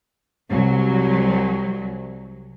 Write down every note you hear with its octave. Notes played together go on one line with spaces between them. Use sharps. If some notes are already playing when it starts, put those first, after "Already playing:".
C2 F#3